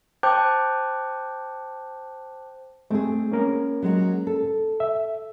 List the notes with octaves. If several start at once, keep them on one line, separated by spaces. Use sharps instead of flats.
C5 G5 A5 D6 F#6 G6
G#3 A3 C4 G#4
A#3 C#4 A#4
F#3 G#3 F#4
A4
E5